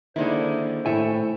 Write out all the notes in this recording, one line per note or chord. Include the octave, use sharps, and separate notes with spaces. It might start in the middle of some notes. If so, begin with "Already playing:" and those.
D3 D#3 G#3 A#3 D4 E4 C5
A2 E4 A4 C#5 E5 G5 G#5